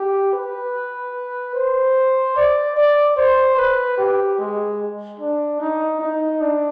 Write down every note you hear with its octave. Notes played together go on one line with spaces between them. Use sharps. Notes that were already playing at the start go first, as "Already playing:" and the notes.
Already playing: G4
B4
C5
D5
D5
C5
B4
G4
G#3
D4
D#4
D#4
D4